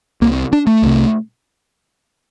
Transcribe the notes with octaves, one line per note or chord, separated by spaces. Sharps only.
C2 C3 A#3
D4
A3
C2 C3